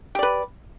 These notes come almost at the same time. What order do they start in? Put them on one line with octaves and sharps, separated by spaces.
G4 D5 B4